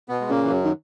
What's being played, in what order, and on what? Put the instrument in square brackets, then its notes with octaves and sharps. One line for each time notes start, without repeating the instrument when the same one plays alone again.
[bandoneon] B2 B3
G#3
[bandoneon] A#2 A#3 [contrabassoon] C#3
[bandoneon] E3
F#2 F#3
[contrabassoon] D#3